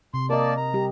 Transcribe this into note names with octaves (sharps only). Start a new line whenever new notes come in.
C3 C6
A#3 A#4 D5 D#5 A5
A#5
G3 G4